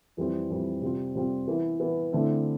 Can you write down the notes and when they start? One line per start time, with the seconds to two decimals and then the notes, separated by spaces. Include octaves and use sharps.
0.17 F2 E3 G3 C4
0.50 F2 E3 G3 C4
0.82 C3 G3 C4 F4
1.15 C3 G3 C4 F4
1.48 E3 B3 E4
1.80 E3 B3 E4
2.12 D3 A3 C4 E4